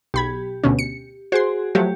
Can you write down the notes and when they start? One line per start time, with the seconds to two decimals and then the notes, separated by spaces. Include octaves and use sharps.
0.14 B1 G4 B5 G#6
0.64 D2 B2 C#4
0.79 C#7
1.32 F#4 G#4 C5 C6
1.75 F3 F#3 A3 G4